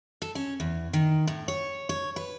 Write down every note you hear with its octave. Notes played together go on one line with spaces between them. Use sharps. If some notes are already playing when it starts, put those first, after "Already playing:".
A4
C#4
E2
D#3
A2
C#5
C#5
B4